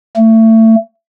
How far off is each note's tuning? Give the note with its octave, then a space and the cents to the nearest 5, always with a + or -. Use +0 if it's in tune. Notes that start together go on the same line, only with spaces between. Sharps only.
A3 +25